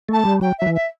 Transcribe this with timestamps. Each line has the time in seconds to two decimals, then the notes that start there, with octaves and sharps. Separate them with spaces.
0.09 A3 A5
0.25 G3
0.41 F#3 G5
0.58 F#3 E5
0.66 E3
0.74 E5